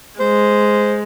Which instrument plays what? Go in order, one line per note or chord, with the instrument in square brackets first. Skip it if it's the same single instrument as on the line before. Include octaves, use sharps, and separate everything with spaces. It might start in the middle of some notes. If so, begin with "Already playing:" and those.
[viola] G#3 [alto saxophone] C5